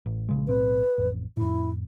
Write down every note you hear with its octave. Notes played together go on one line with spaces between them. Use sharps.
A1
A#1 C#3 G#3
B1 A2 C4 B4
A1 F2
F2 A2 E4